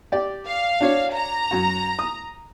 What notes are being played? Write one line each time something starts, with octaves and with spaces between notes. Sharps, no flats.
G4 D5
F5
D4 F#4 C#5
A#5
F#2 F#4
D#6